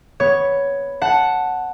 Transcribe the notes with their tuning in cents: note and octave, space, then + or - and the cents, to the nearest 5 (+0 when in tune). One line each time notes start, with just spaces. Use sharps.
B3 +0 C#5 +5
F#5 +0 A5 +0